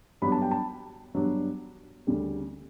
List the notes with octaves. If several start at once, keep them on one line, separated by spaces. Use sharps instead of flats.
G2 F#3 B3 D4 B5
A5
G5
A5
G2 F#3 B3 D4
D2 C#3 G3